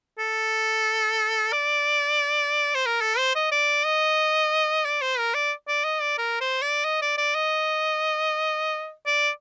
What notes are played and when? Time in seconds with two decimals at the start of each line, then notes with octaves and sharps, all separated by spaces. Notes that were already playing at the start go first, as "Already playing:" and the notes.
0.19 A4
1.52 D5
2.75 C5
2.86 A#4
3.01 A4
3.18 C5
3.35 D#5
3.52 D5
3.85 D#5
4.85 D5
5.02 C5
5.18 A#4
5.34 D5
5.68 D5
5.84 D#5
6.01 D5
6.18 A#4
6.41 C5
6.62 D5
6.85 D#5
7.02 D5
7.18 D5
7.35 D#5
9.06 D5